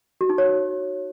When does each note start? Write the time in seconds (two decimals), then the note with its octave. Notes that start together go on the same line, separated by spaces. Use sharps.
0.21 F#4
0.29 D#4
0.38 C#5